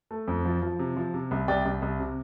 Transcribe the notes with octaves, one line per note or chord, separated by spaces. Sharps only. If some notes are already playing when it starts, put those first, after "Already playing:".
A3
F2
F3
F3
C3
F3
C3
C2
C2 D5 G5
C2
C2
C3